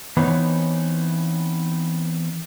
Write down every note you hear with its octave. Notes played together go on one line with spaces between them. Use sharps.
E3 B3 C4 D#4 C#5